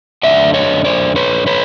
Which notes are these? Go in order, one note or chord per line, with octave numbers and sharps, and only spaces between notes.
F#2 D3 F3 A3 D4 D5 E5
C#5 D#5
C5 D5
B4 C#5
B4 C#5